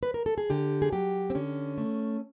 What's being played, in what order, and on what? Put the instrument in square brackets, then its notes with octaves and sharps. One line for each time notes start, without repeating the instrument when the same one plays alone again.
[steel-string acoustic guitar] B4
A#4
A4
G#4
D3 G4
G#4
F#3 G4
C4
D3 C#4
A3